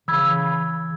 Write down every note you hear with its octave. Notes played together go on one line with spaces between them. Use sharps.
C#3 E3 B5 E6 G#6